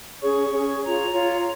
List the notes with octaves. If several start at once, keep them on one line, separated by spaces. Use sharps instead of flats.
C#4 G#4 C#5 C#6
C#4 G#4 C#5
F4 C#5 A#5
F4 C#5